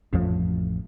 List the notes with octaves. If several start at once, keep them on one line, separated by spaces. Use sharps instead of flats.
A1 F2 A2 F3